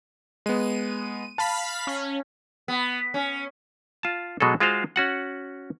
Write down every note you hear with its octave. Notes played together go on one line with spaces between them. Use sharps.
G#3 B3 D#7
F5 A5 B5 B6
C#4
B3
C#4
F4 A5
B2 F#3 G#3 F#4 G#4 A4
G#3 F4 F#4 C5 F5
C#4 F#4 F#5